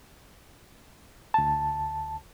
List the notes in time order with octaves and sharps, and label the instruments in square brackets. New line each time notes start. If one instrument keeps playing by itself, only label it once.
[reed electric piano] D2 A5